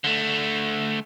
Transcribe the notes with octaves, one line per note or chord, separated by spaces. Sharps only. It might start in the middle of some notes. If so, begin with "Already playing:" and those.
D3 A3